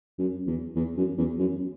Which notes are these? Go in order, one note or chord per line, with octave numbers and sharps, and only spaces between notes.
F#2
E2
E2
F#2
E2
F#2